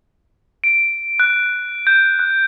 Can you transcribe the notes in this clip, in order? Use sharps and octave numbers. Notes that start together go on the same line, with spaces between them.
D7
F#6
G6
F#6